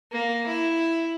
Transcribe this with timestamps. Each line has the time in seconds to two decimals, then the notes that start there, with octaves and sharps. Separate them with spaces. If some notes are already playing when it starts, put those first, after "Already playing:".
0.11 A#3
0.46 E4